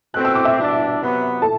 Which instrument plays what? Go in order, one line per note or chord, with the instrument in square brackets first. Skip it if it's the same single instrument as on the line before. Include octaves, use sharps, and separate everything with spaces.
[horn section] B2 A3 C4 [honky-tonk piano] F#6
[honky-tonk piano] E6
D6
E5 E6
[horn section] B2 G3 D4
C3 F#3 B3
[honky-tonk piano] A4 A5